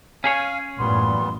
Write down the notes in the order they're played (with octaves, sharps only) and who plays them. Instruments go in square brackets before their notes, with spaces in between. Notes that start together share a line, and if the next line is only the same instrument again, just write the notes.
[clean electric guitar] C#4 G#4 C#5 [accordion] F5 G#5
[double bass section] A1 F#2 [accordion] A#2 G3 B3 [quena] C6